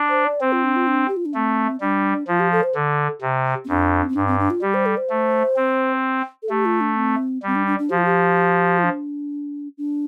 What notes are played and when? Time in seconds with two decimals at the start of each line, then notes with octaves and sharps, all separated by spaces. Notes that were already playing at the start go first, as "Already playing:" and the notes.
Already playing: D4
0.09 C5
0.25 D5
0.40 C4 C5
0.52 F4
0.64 D4
0.76 F4
0.87 D4
1.08 G4
1.17 F4
1.26 D4
1.34 A3 C4
1.81 G3 D4
2.28 F3 F4
2.40 G4
2.52 A4
2.63 C5
2.75 D3
3.22 C3
3.65 C4
3.69 F2 D4
4.09 C4
4.15 G2 D4
4.27 C4
4.39 D4
4.50 F4
4.62 G3 G4
4.74 C5
4.86 A4
4.97 C5
5.10 A3
5.56 C4
6.43 A4
6.50 A3 G4
6.65 F4
6.81 D4
6.96 C4
7.43 G3 C4
7.55 D4
7.67 D4
7.79 D4
7.90 F3 G4
7.98 F4
8.05 G4
8.79 F4
8.84 D4
9.78 D4